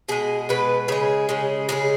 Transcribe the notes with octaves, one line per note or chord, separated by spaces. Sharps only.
B2 G#3 G#4
B2 G#3 B4
C#3 G#3 G#4
C#3 G#3
C#3 E3 G#3 G#4